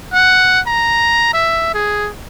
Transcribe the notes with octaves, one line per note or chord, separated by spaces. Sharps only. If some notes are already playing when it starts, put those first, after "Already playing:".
F#5
A#5
E5
G#4